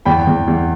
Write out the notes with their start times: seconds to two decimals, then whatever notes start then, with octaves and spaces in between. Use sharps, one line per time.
0.05 E2 G5 B5
0.27 E2
0.48 E2